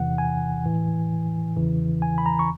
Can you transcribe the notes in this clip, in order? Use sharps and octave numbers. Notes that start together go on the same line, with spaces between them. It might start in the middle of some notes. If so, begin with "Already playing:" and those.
Already playing: E2 C3 E3 F#5
G#5
A2 E3
E2 C#3 E3
G#5
B5
A#5
C#6